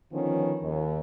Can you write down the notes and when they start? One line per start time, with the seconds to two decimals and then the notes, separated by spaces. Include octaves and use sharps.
0.12 D3 D#3 F3 B3 C#4
0.63 D#2